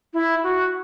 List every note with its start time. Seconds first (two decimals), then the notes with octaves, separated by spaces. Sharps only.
0.14 E4
0.44 F#4